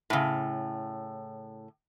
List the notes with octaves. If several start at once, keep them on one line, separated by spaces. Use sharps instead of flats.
A2 C#3